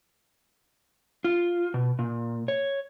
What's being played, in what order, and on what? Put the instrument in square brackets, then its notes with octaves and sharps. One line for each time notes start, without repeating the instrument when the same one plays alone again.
[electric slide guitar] F4
B2
A#2
C#5